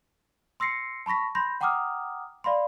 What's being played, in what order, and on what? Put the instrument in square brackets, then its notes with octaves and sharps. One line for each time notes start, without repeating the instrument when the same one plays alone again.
[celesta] C6 E6 A#6 C7 C#7
A5 B5 C#6 A#6 B6
B5 C6 G6 A#6
F#5 G5 A#5 D6 D#6 F6
D5 F5 B5 C6